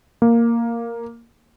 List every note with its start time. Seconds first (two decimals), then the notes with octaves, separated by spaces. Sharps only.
0.22 A#3